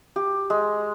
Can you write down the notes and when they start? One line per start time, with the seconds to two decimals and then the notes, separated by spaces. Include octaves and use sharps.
0.16 G4
0.50 G#3